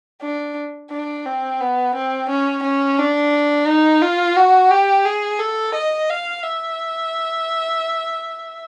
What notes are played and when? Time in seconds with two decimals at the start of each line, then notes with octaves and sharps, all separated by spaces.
0.21 D4
0.91 D4
1.25 C4
1.60 B3
1.95 C4
2.29 C#4
2.63 C#4
2.98 D4
3.66 D#4
4.02 F4
4.36 F#4
4.70 G4
5.05 G#4
5.39 A4
5.74 D#5
6.09 F5
6.43 E5